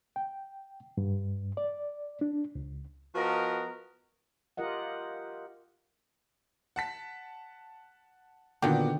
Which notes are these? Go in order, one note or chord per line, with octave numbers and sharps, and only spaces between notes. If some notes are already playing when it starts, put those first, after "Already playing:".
G5
G2
D5
D4
C#2
F3 B3 F#4 A#4 D#5
F4 G4 A#4 D#5 F#5
F#5 A5 B6
A#2 D3 D#3 B3 F#4 G5 D6